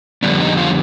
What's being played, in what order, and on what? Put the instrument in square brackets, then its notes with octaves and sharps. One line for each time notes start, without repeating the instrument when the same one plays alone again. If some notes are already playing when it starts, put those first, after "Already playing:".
[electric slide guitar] F2 D3 G3 B3 D4
D#4
F4